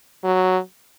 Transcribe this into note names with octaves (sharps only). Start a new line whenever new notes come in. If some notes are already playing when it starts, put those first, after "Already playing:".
F#3